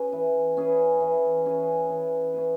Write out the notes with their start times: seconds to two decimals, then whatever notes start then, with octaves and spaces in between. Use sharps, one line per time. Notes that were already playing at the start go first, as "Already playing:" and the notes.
Already playing: C#4 G#4 B4
0.12 E3
0.57 C#4 G#4 B4
1.00 E3
1.46 C#4 G#4 B4
1.90 E3
2.34 C#4 G#4 B4